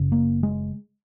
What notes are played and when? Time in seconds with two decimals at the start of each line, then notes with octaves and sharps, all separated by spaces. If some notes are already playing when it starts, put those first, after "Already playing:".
Already playing: F#1 C#3
0.12 A#3
0.43 G#3